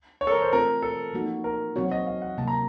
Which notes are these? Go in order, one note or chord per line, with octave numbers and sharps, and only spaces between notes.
C#5
A4
A#4
C5
A3 C4 F4 A4 A#4
A4
F3 A#3 D#4 F#4
A#4
F#3 C4 F#4 C#5
D#5
F5
F#5
C3 F#3 A#3 A5
A#5